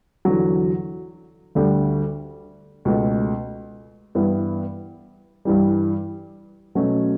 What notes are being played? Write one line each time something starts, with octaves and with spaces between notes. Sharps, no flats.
E2 D3 F#3
D2 D3 G3
C#2 B2 A3
G2 E3 B3 E4
G2 E3 G3
B2 F#3 A3 C#4